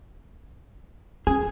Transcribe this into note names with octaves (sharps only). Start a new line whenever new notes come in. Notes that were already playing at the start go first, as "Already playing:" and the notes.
C#4 G#4